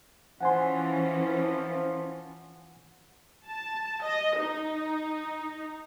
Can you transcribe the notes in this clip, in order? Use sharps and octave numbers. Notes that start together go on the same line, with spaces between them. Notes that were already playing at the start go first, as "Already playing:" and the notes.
E3 F3 C#4 F#5 G#5 C6
A5
D#5
D#4